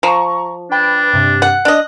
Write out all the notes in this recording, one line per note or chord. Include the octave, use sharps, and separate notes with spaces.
F3 A#5 C#6
D4 B4 G5 B5
G2 C3
F#5
D4 D#5 F#6